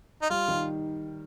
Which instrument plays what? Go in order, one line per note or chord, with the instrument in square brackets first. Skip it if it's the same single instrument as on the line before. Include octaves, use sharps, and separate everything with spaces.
[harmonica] D#4
[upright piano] G3 [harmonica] F4
[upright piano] D#3